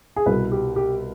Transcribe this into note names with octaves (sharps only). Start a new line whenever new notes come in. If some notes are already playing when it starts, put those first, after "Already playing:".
G#4
C2 B2 B4
G4
G4